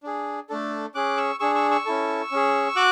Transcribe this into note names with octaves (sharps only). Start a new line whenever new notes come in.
D4 G#4
A3 D4 A4
C#4 G#4 D6 F#6
C#6 E6
D4 G#4 C#6 E6
C#6 E6
C#6 E6
C#4 E4 A4
C#4 G#4
F#4 D6 F#6